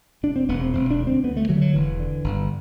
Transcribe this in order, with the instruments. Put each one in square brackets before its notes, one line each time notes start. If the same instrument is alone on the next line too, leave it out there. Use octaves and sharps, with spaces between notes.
[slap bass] E1 D4
C4
E1 B3
C4
E1 C4
D4
D2
C4
D2 B3
A3
D3 F#3
G3
F#3
E1 E3
D3
G1